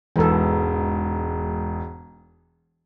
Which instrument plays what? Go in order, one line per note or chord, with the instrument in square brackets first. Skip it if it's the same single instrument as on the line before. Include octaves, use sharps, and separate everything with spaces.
[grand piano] E1 G#2 [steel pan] E3 A4